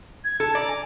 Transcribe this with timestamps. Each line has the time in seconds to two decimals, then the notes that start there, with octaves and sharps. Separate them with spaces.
0.24 G#6
0.40 A4
0.55 D5 A#5
0.68 G#5